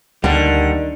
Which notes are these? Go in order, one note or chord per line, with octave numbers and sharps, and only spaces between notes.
D2 D3 D#3 G3 A#3 D4